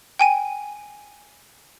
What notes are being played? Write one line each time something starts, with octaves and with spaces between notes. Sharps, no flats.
G5 G#5 D#7